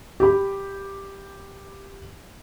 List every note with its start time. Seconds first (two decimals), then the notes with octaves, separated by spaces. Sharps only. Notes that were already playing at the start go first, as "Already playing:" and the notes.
0.20 G4 B5